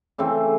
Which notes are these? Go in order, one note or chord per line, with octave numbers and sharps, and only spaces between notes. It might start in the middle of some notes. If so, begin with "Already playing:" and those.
C#3 E3 A3 C4